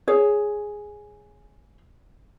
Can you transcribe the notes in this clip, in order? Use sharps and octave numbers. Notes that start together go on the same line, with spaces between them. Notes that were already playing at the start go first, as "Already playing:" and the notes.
G#4 C#5